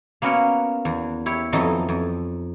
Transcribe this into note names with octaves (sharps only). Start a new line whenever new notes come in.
A#3 B3 C#4 F#4 A#4 C#5
E2
E4 G4 C#5
F2 E3 F#3 D#4 A4 D#5
F2